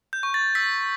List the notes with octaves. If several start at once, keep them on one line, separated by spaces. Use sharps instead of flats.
G6
C#6
A6
E6 B6